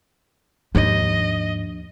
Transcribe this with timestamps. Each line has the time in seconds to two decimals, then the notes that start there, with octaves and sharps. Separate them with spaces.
0.75 D#2 G#2 F3 D4 D#5